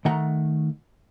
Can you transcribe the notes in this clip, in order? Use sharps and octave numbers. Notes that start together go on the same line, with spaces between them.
D#3 A3 F#5 A#5